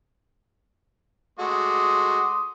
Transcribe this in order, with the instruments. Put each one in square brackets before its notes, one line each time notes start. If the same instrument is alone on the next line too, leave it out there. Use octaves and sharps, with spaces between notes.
[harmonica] G#3 A3 F#4 [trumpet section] C6 D6 D#6